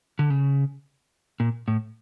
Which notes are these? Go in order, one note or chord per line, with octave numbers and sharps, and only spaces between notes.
D3
C#3
A#2
A2